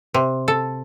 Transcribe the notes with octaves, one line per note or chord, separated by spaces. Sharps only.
C3
A4